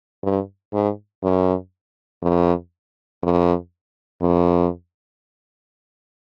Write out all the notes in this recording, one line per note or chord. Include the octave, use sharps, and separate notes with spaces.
G2
G#2
F#2
F2
F2
F2